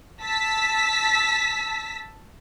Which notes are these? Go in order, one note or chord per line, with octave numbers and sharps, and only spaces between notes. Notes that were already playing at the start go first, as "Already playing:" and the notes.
A5 E6 B6